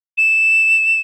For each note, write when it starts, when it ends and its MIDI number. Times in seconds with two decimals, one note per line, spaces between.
0.18 1.00 100